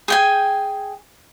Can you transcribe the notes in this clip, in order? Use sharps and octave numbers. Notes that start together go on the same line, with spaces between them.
G#4 G5 G#5